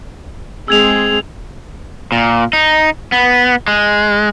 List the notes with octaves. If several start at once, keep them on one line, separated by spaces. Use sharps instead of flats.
G#3 C4 G#4 E6 G#6 F7
A#2
D#4
B3
G#3